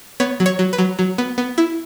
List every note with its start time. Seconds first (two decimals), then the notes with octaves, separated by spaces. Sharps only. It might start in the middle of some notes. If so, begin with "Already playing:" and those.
0.20 B3 C#5
0.40 F#3
0.46 C#5
0.59 F#3
0.73 B4
0.78 F#3
0.99 F#3
1.18 B3
1.38 B3
1.58 E4